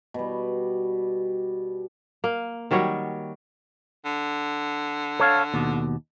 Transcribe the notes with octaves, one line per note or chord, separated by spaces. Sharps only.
B2 G3
A#3
D#3 F#3 G3 C#5
D3
A4 C#5 F5
D#2 B2